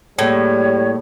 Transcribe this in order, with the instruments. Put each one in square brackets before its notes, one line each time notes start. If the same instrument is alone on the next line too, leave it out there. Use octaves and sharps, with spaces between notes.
[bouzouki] A2 [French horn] G3 [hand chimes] A#3 G#4 A4 [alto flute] C#5